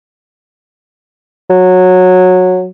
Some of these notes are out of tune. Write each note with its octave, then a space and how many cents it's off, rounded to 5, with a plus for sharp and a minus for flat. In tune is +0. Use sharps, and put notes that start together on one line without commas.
F#3 -15